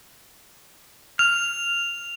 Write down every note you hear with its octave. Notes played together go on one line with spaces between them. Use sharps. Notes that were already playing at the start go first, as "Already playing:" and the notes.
F6 F7